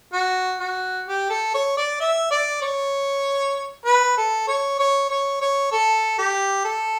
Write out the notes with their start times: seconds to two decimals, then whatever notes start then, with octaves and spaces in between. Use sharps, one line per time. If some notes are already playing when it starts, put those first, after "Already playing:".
0.14 F#4
0.60 F#4
1.07 G4
1.30 A4
1.54 C#5
1.77 D5
2.00 E5
2.31 D5
2.62 C#5
3.86 B4
4.17 A4
4.48 C#5
4.79 C#5
5.10 C#5
5.41 C#5
5.72 A4
6.18 G4
6.65 A4